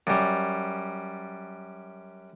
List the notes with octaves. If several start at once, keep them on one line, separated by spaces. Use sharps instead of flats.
F#2 G3